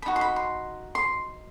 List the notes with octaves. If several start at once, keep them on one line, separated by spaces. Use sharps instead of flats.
B5
D#4 F#4
C6
B5
C6
C6